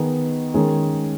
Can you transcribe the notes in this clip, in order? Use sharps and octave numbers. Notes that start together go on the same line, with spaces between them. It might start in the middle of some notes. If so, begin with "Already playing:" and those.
Already playing: D#3 B3 D#4 G#4
D#3 G#3 C#4 G#4